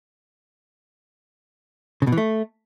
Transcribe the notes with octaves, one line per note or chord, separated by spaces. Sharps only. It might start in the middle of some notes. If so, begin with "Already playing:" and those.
C#3
B2
E3
A3